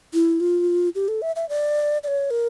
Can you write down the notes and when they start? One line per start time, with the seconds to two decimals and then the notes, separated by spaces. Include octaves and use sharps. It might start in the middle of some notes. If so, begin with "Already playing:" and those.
0.14 E4
0.40 F4
0.95 G4
1.08 A4
1.22 E5
1.36 E5
1.49 D5
2.04 D5
2.08 C#5
2.31 A#4